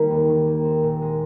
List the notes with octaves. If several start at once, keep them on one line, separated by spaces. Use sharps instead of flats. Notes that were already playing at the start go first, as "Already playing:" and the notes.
Already playing: D#3 G3 A#3
D#2
D#3
A#3
C4
A#2
G#3